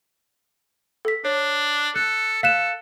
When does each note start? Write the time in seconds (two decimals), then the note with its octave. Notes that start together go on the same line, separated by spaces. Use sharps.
1.05 A4 B6
1.25 D4 C#5
1.96 A4 F#6
2.43 A4 F5 F#6 E7